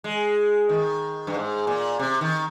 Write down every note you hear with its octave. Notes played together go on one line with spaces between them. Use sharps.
G#3
D#3
G2
G#2
A#2
C3
D#3